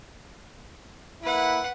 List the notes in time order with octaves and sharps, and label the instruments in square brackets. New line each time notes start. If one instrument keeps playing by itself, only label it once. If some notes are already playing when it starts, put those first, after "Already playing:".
[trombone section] A#3 E4 [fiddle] B4 F#5